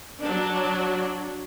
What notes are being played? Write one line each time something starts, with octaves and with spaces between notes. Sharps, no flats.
F#3 D4